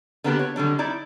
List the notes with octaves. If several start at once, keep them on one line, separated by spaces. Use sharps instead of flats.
D3 A#3 B3 D4 E4 G4
C#5
D3 F#3 G3 D4
D#4 E4 D5